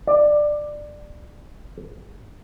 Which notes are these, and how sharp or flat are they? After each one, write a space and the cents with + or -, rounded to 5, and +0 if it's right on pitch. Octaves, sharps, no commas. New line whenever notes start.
D5 +15